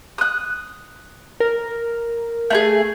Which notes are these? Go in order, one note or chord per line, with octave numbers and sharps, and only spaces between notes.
D#6 F#6
A#4
A3 D#4 G#4